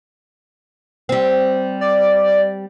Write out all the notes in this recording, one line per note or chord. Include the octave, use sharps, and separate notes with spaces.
G3 C4
D5